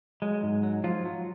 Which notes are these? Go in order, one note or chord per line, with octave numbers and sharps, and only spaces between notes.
F#3 G#3
G#2
F#3
F3 F#3 F4
F#3